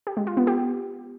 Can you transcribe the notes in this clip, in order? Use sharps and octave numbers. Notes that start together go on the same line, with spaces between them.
G4
G#3
F4
B3
G4